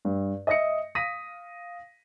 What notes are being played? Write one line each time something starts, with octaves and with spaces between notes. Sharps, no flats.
G2
D#5 E5 D#6 A#6 C#7
F5 D#6 A#6 B6 D#7